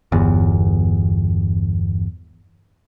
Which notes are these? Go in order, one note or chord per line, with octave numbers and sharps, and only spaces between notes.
G1 E2